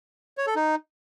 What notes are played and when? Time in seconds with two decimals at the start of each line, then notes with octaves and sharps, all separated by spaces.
0.38 C#5
0.47 A4
0.56 D#4